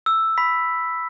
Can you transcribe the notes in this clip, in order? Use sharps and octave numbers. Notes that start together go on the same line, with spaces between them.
E6
B5 B6